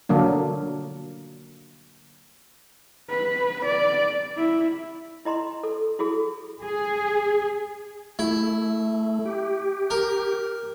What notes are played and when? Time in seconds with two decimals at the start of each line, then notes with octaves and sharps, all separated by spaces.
0.09 D3 F#3 A#3 D4
3.10 B4
3.66 D5
4.37 E4
5.25 E4 D#5 A#5 C6
5.63 A4
5.99 E4 F#4 G#4 A4
6.63 G#4
8.19 A3 E4
9.25 G4
9.90 A#4